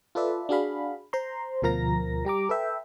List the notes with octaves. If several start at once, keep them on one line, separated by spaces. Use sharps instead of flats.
F4 A4 B4 D5 E5
D4 F#4 G#4 F5 B5
C5 A#5 C6
D2 B2 F3 A#4 A#5 A#6
G3 G4 A#5 D6
A4 B4 E5 G5